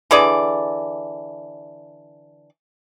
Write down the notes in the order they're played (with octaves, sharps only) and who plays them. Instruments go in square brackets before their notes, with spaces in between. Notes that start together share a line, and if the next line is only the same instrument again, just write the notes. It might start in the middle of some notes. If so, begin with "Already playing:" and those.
[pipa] D3 E3 G#4 D5